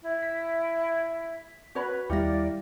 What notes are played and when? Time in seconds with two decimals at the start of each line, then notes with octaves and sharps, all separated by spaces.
0.02 E4
0.23 B6
1.75 F#4 B4 C#5 B5
2.10 D#2 G3 E4 G4 D5 F5 A#6